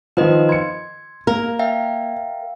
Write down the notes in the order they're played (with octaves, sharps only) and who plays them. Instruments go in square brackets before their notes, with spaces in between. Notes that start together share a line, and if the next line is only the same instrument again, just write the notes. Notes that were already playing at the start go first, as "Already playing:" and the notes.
[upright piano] D#3 F3 [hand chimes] B4 C5 D#5
[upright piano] C6 C#7 [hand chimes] G#6
[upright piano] A#3 [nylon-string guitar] A#4
[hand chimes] E5 F5 G5